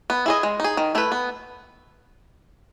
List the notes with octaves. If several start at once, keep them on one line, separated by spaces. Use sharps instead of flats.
B3
E4 G#4 D#5
G#3
D#4 G#4
D#3
A3 E4 B4
B3